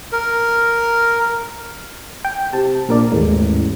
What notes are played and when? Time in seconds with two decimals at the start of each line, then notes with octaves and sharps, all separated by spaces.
0.12 A#4
2.25 G5
2.53 C3 A5
2.88 A#1 A#2 A#4 D5
3.12 A1 D#2 G#2 G#3